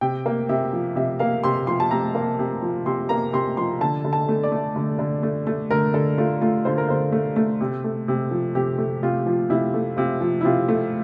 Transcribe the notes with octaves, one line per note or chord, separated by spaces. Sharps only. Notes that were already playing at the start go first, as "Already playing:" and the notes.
C3 G5
A#3
C3 E5
F3
C3 E5
A#3 F5
C3 C6
F3 C6
A5
C3 A#5
A#3
C3
F3
C3 C6
A#3 A#5
C3 C6
F3 C6
D3 A5
D3
A5
A3
D5
A3
D3
D3
A3
A3
D3 A#4
D3 A4
A3 F4
A3 F4
D3 C5
A#4
D3 C5
A3
A3
C3
A3
C3
F3
C3 G4
A3
C3 F4
F3
C3 E4
A3
C3 F4
F3
E4
C3 F4
A3